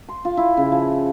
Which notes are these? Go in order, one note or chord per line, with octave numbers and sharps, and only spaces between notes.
C6
F4
E4
C#3
F3